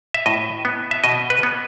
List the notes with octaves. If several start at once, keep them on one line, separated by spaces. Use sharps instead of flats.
E5
A2 D#5
B3
E5
B2 D#5
B4
B3